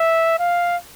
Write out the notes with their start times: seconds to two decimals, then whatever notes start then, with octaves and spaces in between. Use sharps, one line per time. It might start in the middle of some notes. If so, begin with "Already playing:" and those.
Already playing: E5
0.39 F5